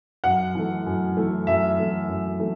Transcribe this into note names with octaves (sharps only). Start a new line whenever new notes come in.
F#2 F#5
E3 A3
F#2
E3 A3
F#2 E5
E3 A3
F#2
E3 A3